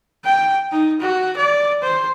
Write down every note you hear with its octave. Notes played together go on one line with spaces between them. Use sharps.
G5
D#4
F#4
D5
C5